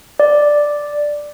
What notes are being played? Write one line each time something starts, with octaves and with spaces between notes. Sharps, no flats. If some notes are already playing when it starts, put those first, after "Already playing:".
D5